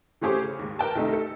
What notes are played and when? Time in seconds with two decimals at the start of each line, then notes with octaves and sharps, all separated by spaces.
0.21 E3 A3 C#4 G4 G#4 C5
0.42 C#3
0.59 D#2 G#2
0.79 A#4 B4 G5 A5
0.95 C2 D#3 A3 D#4
1.13 A4